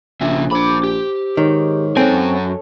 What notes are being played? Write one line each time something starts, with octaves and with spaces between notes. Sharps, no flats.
A#1 C#3 E5
D4 C5 B5 D6 E6
G4
G#2 D#3 C#5
F#2 C4 A4 C#5 D#5 G#5